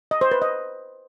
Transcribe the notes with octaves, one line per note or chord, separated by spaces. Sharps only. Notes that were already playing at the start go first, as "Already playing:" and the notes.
D#5
C5
B4
D#5